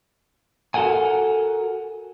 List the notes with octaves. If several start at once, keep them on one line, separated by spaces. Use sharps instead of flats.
F#4 A4 A#4 F#5 G#5